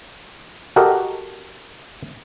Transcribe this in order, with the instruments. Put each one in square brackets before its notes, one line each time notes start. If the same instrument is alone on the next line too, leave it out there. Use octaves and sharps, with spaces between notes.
[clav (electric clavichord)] F#4 G4 A4 A#4 D#5